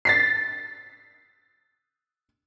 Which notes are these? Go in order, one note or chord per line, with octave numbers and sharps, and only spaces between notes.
A6 B6 C7